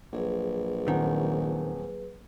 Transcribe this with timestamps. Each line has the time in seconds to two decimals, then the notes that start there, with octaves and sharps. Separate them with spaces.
0.13 A#1 F#3 G#4 B4
0.88 D#1 D#3 C4 F#5